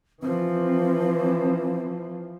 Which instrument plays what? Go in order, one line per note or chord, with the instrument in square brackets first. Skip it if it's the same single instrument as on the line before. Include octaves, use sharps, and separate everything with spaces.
[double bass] E3 F3 [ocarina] C4